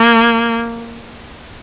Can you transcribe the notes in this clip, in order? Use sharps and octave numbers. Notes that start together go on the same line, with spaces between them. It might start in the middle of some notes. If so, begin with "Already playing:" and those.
Already playing: A#3